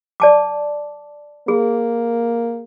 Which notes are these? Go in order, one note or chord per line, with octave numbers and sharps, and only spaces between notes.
D5 A5 D6
A#3 G#4